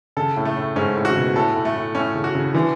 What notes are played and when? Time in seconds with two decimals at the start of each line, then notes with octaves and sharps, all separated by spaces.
0.17 C#3 A4
0.36 A2
0.45 A3
0.56 A2
0.76 G#2 C#4
0.96 A2
1.05 C#3 F#4
1.16 B2
1.36 A2 A4
1.55 A2
1.65 A3
1.75 A2
1.95 A2 C#4
2.15 C#3
2.24 F#4
2.35 C#3
2.54 D3 E3